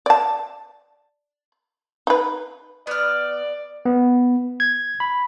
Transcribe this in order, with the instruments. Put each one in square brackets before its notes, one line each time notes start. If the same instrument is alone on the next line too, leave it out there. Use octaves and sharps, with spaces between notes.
[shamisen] D5 A5
D#4 B4
[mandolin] B3 F6 [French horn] D5
[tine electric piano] B3
G#6
B5